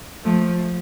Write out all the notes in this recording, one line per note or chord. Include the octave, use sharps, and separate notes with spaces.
F3 A3